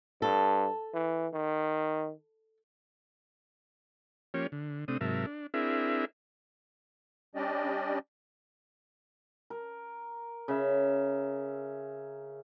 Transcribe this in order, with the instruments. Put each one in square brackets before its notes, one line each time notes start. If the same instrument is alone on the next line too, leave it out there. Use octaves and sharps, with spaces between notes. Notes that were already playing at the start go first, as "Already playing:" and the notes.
[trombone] G2 [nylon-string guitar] A4
[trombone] E3
D#3
[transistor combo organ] F3 A#3 C#4 G4 C#5
D3
C3 A3 C4 D4 D#6
G#2 C3 F#3 A#4 E5 A5
D4
C4 D4 E4 G#4 A#4 E5
[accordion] G3 C#4 D4 G4 D5 D#5
[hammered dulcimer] A#4
C#3 E5